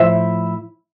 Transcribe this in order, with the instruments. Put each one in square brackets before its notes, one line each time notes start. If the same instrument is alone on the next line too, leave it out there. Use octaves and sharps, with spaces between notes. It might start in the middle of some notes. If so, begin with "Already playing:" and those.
Already playing: [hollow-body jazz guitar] A2 F3 E4 C5 E5